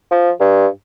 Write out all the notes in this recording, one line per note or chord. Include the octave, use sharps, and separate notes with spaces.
F3
G2